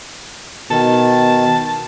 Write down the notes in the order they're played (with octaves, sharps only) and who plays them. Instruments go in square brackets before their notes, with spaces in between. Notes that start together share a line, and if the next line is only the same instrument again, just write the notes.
[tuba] B2 [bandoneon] D#3 [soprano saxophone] A5